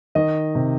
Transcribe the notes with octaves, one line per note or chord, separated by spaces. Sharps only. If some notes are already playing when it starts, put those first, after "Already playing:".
D#3 D#5
C3